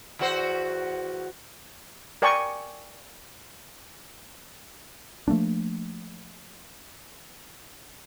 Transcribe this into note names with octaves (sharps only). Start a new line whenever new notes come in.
E2 F#4 C5
A#4 D5 G5 G#5 C#6
F3 A3 A#3 D4